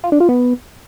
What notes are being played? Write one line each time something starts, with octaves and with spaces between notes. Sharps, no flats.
F4
D4
F4
B3